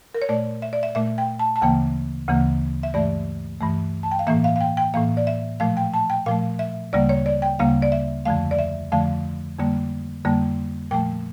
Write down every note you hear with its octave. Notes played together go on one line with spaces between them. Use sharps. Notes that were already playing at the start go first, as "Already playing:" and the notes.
A#4
C#5
A#2 A3 D5
E5
D5
E5
A#2 A3 E5
G5
A5
A5
D2 C#3 E3 A#3 G5
D2 C#3 E3 A#3
E5
G2 E3 A3 D5
G2 E3 A3
A5
G5
F5
A2 E3 A#3 E5
F5
F5
G5
G5
A2 E3 A#3 F5
D5
E5
A#2 F3 A3 F5
G5
A5
G5
A#2 F3 A3 F5
E5
D2 C#3 G3 A#3 D5
C#5
D5
G5
D2 C#3 G3 A#3 F5
D5
E5
F2 D3 F3 A3 F5
D5
E5
F2 D3 F3 A3 F5
F2 D3 G3 A#3
F2 D3 G3 A#3
A#2 F3 A3 G5